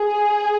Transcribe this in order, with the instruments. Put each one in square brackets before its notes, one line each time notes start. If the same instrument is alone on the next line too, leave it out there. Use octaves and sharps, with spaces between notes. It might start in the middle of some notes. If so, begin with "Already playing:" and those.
Already playing: [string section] G#4